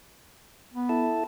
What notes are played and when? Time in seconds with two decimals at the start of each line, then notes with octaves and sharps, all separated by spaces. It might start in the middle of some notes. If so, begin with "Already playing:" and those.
0.74 B3
0.89 E4 A4 A5